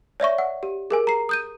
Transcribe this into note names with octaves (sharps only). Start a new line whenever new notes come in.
C#5 D5 E5 C#6
F#5
G4
G#4 A#4 G#5
A#5 C7
D#6 G6 D#7